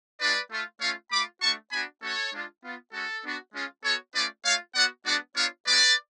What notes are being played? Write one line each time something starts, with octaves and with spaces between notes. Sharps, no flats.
G#3 D4 F4 B4 D5
A3 F4
A3 C#4 F4 C#5 F5
A3 F4 B5 D6
A3 D4 F#4 A5 C#6
B3 D4 F#4 G#5 B5
A3 C#4 F#4 A4 C#5
G#3 D4 F4
B3 F4
G#3 C#4 F#4 A4
B3 D4 F#4
G#3 C#4 F4
B3 F#4 A4 C#5
A3 C#4 F4 B4 D5
A3 F4 C#5 F5
B3 F#4 D5 F#5
G#3 B3 D4 F#4 D5 F#5
B3 D4 F4 C#5 F5
G#3 C#4 F#4 B4 D5